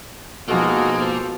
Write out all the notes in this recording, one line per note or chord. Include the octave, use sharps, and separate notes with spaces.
B2 F3 G#3 A#3 D#4 F#4 A4
A4 C5